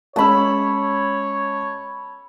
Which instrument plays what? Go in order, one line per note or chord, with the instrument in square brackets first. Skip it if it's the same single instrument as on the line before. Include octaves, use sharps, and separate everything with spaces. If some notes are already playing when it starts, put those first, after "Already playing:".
[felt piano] G#3 C#4 E6 [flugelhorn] C#5 [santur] A5 B5